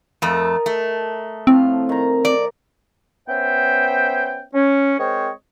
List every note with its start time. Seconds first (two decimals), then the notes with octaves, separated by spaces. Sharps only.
0.22 F2 A3 A#4 D#5 A#5
0.66 A3
1.47 A2 F3 C4 F5
1.89 D#3 A#5
2.25 D5
3.27 B3 C#4 C5 E5 G5
4.54 C#4
4.99 G#3 C4 A#4 C5 C#5 D#5